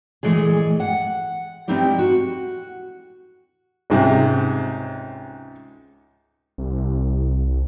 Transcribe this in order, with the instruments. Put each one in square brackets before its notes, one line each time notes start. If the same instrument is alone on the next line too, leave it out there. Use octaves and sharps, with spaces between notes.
[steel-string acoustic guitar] A#2 E3 G#3 A3 G#4
F#5
G3 B3 C4 D#4 E4 G4
F#4
[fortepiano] C#2 G#2 C3
[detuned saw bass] C2